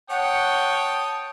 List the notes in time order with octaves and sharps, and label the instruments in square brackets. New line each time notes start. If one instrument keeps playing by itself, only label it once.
[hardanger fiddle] C#5 [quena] F#5 [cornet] G5 [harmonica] A5 D#6